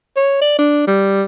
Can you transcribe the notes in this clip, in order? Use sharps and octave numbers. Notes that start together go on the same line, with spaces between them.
C#5
D5
D4
G3